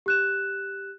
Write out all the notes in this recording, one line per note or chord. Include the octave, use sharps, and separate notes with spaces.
G4 F#6 E7